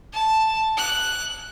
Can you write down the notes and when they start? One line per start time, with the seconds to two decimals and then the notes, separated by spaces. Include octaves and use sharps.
0.13 A5
0.77 F#6